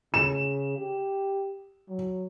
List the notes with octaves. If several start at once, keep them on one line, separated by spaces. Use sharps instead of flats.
C#3 E7
G4
F#3